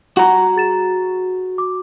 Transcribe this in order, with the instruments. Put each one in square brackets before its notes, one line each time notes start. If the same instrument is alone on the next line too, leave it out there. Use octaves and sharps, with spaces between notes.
[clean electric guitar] F#4 A#5 [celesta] F#5
[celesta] G#4 A6 E7
D6